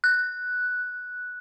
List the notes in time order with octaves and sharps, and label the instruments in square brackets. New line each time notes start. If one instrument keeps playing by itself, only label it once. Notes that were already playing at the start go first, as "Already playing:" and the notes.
[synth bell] F#6